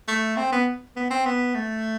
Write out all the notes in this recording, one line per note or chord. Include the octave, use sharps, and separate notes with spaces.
A3
C4
B3
B3
C4
B3
A3